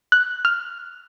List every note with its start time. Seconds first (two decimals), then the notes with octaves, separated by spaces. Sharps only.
0.12 F#6
0.45 F6